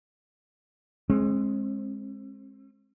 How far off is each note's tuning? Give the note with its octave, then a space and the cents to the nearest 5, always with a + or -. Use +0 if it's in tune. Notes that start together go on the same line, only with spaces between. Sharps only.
G#3 +0 C4 +40